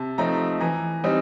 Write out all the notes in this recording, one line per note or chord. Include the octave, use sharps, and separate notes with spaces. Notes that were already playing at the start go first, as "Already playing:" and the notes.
Already playing: C3 A5
F3 A3 C4 D#4 A#5
E3 A#5
G3 C4 D#4